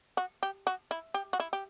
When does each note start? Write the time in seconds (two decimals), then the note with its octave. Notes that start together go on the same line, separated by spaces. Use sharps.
0.17 F#4
0.43 G4
0.67 F#4
0.91 E4
1.14 G4
1.33 F#4
1.40 E4
1.53 G4